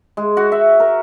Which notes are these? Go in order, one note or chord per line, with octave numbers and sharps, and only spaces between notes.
G#3
F#4
E5
A#4